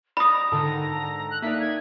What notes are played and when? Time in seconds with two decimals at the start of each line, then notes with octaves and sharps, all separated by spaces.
0.17 D5 D#5 G5 A#5 B5 D#6
0.52 G#2 D3 D#3 A4
1.30 F#6
1.42 A3 A#3 D#4 D5 G5 B6
1.60 G#6